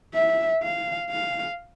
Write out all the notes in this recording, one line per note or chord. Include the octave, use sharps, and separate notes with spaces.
E5
F5
F5